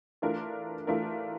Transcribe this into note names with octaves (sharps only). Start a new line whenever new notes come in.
E3 A3 D4 F4 A#4
E3 A3 D4 F4 A#4